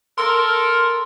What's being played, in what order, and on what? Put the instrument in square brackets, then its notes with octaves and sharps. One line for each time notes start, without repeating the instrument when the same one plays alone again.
[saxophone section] A4 A#4 [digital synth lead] C6